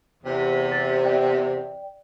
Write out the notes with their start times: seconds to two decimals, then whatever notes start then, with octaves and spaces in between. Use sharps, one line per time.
0.24 E2 C3
0.72 A6
1.04 D5 G5